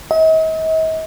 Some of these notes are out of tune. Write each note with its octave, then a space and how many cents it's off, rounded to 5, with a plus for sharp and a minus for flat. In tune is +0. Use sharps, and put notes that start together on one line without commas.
D#5 +45